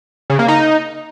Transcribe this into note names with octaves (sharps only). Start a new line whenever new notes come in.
C#3
A#3
D#4